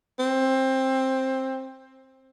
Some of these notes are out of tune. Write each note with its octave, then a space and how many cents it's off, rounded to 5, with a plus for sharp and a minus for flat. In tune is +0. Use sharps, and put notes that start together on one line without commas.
C4 +15